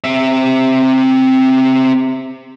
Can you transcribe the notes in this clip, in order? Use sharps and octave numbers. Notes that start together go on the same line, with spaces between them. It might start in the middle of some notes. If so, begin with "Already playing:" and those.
C4 E5